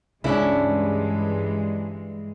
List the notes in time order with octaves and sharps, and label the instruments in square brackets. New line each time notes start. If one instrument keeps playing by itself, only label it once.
[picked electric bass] C#2 C#3 [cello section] G2 E3 G#3 [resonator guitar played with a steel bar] C#4 D4 E4